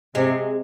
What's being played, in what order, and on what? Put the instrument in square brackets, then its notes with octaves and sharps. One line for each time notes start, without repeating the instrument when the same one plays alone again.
[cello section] C3 [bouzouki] G#3